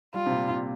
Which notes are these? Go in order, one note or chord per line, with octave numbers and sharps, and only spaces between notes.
G3 F4
C3
A#2
A#2